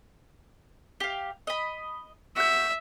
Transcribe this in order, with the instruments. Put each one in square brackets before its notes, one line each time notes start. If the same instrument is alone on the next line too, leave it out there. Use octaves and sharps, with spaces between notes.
[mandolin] G4 F5
D#5 B5
[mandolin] F#4 G6 [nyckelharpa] E5